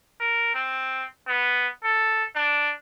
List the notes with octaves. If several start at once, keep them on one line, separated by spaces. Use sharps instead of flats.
A#4
C4
B3
A4
D4